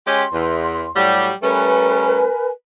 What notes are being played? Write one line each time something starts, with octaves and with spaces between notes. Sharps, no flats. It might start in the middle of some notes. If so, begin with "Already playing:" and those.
G#3 C#4 G4 C6
E2
A2 F#3 G3
G3 A3 C#4 A#4 B4 G#5